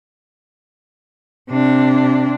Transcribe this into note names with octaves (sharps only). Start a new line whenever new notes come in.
C3 D4